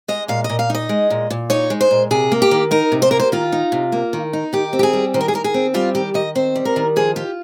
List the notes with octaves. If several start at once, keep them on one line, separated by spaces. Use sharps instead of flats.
G#3 D#5
A#2 F5
D#5
A#2
F5
D#4 D#5
G#3
A#2
A#2
D#4 C#5
G#3
C5
A#2
C3 G#4
A#3
G4
D#3
D#4 A#4
C3
C5
A#3 A#4
C5
D#3 F4
D#4
C3
A#3
D#3
D#4
D#3 G4
C4
G4
G#4
G3
D#3 C5
A#4
G#4
D#3 A#4
G#4
C4
G3 F4
D#3 G4
D#3 D#5
C4 C5
G3
A#4
D#3
F3 G#4
F4 G4